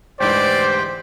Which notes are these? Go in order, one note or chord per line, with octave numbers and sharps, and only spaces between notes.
D2 G#2 E3 G4 C5 D5 G5